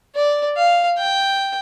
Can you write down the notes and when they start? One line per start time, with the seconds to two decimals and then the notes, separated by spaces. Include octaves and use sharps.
0.16 D5
0.57 F5
0.98 G5